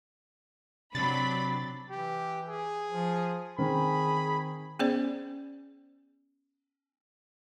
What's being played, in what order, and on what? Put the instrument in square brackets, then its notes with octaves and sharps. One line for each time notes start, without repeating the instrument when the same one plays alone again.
[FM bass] C3 [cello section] F#3 C4 D4 [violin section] B5 [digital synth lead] A6
[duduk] E3 [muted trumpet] G4
[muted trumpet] G#4
[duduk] F3
[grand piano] D#3 C4 [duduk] G#4 [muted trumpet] B5
[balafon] B3 C#4 G#4 C5 D5